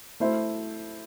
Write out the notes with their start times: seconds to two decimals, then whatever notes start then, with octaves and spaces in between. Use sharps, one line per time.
0.20 A3 E4 C5 E5